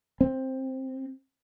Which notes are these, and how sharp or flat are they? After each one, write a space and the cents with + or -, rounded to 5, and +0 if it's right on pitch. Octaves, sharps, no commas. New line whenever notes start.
C4 +10